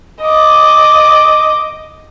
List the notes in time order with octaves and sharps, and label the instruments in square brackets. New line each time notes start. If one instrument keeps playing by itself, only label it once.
[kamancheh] D#5 D6